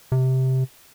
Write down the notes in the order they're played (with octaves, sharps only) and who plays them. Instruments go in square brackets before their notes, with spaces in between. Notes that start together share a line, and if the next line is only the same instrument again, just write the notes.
[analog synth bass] C3